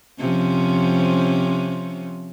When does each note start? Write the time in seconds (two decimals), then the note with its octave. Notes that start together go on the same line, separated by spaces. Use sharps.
0.20 C3 F3 C#4